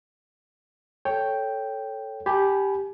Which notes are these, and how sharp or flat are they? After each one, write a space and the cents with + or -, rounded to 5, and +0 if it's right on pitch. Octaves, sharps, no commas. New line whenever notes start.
A4 +0 C#5 +0 G5 +0
G4 +0 G#5 +30 B5 -5